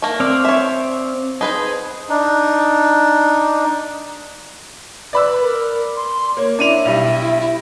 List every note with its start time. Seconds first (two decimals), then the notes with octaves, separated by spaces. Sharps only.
0.02 A3 A#3
0.20 C4 D5 F5
0.45 C#5 E5
1.41 D#4 G#4 B4 C5
2.09 D4 D#4
5.13 B4 D5 B5 E6
5.42 A#4
5.96 C6
6.37 A#3 C#5
6.59 D4 E4 D#7 F7
6.85 B1 G3